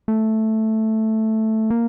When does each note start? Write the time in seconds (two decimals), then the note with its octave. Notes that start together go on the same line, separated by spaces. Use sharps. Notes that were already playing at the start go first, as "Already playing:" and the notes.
0.08 A3
1.70 A#3